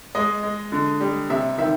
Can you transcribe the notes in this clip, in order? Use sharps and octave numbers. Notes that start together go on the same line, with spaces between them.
G#3 D#5
G#3
D3
G3
C3 E5
D#3 E5